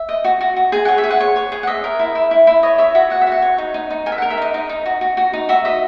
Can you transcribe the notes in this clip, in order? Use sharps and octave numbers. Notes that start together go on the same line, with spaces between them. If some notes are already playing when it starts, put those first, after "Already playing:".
Already playing: E5
D#5
F#4
F#4
F#4
G#4 G#5
C#5 F#5
E5
G#4
F#5
C#5
C#5
G#4
F#5
D#5 E5
A#4
E4
E4
E4
E4
C#5 D#5
C#5 E5
F#4 E5
F#4 F#5
E5
F#4 F#5
C#5
D#4
D#4
D#4
A#4 G#5
E5
A#4 F#5
E5
D#4 D#5
D#4 D#5
D#4
F#4
F#4
F#4
D#4
F#4 E5
D#5 E5